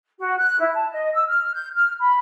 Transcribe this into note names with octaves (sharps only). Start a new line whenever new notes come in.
F#4
F#6
E4
A5
D#5
E6
F6
G6
F6
B5